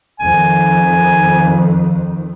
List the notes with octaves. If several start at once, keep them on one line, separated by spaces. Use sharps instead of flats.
F2 D#3 G#5